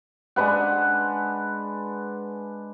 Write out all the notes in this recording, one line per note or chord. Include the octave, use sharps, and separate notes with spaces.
G#3 D4 B4 F#5